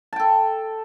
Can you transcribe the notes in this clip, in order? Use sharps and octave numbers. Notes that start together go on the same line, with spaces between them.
A4 G5 A5